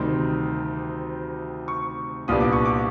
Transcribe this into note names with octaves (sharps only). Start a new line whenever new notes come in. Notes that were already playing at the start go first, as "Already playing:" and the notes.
Already playing: D2 C3 D#3 G3 C6
C#6
C2 A#2 G3 B3 D4 D#6
D6
C#6
D6